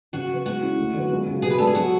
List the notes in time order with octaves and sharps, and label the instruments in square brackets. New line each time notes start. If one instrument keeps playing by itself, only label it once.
[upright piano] C#3 [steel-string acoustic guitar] F#4
[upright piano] F#3 B3
[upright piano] G#3 [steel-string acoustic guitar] F#4
[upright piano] C#4 E4
D2
D3 F#3 B3
C#2
C#3 F#3
[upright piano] B2 [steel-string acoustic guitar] G#4
[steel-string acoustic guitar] B4
[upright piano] G#3 D4 [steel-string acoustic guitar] A4
[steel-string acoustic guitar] G#4
[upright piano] F#3 [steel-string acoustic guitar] F#4